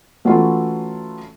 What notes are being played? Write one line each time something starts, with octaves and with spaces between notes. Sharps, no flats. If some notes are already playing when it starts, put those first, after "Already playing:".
E3 F#3 A3 C#4 E4 F4